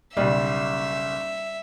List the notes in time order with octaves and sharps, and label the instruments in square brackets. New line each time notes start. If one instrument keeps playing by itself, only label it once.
[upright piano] F#1 B1 [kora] G3 [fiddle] E5